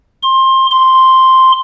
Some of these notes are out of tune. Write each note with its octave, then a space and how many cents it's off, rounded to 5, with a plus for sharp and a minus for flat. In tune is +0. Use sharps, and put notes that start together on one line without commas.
C6 +20
C6 +0